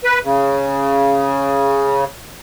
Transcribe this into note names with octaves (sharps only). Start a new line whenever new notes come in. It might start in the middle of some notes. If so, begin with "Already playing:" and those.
B4
C#3